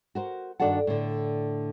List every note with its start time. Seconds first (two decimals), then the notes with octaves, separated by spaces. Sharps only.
0.15 F#4 A#4 C5
0.60 G2 D#3 D4 F#4 A4 F#5
0.87 A2 D3